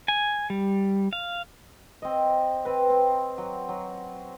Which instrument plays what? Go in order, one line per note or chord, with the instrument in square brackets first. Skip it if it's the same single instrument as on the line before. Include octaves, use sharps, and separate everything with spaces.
[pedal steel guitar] G#5
G3
F5
[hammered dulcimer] C4 D#5
C4 B4
C4
F#3
F#3